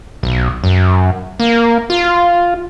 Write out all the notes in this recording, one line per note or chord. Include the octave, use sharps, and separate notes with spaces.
B1
F#2
A#3
F4